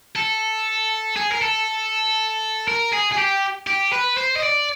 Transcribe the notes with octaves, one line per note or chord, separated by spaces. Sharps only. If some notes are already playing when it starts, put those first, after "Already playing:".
A4
G#4
A#4
A4
A#4
G#4
G#4
G4
G4
B4
C5
D#5
D5